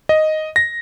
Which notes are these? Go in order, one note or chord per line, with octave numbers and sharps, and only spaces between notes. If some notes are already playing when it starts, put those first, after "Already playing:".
D#5
A#6